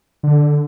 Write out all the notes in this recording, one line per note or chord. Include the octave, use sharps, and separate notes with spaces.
D3